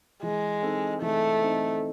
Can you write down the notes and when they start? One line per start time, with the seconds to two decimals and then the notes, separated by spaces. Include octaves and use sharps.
0.23 E3 G#3
0.62 C4 D#4 A4
1.02 E3 A3
1.41 C4 D#4 A4